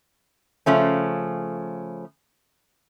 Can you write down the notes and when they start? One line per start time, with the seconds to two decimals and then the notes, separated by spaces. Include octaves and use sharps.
0.66 C#3 F3 A3 C#4